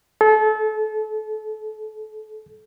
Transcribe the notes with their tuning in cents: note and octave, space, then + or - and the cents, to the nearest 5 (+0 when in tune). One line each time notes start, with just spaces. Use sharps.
A4 -30